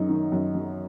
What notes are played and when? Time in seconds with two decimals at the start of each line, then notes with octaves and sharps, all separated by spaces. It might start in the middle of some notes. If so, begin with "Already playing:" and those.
Already playing: F#2 F#3 D#4
0.09 D#3
0.32 F#2
0.55 F#3